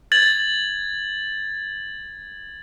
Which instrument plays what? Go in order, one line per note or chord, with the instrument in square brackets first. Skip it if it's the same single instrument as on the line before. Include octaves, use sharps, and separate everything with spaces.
[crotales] G#6 A6 F#7